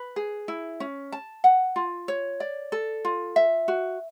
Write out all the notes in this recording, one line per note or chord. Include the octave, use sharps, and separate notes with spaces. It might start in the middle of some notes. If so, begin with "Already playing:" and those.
Already playing: B4
G#4
E4
C#4
A5
F#5
F4
C#5
D5
A4
F4
E5
F#4